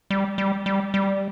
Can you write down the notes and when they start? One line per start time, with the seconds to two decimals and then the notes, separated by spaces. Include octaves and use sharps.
0.10 G3
0.38 G3
0.66 G3
0.94 G3